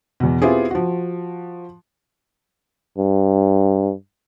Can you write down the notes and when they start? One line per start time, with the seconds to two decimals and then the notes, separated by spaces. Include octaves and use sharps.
0.20 E2 B2
0.42 B3 C4 E4 F4 G4 G#4
0.71 F3 F#4
2.98 G2